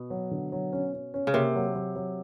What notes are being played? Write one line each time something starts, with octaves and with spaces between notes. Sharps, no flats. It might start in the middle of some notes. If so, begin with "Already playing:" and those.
Already playing: B2
F#3
D3
F#3
C#4
C#4
C#4
C#3
C3 A#3
F#3
F#3
F#3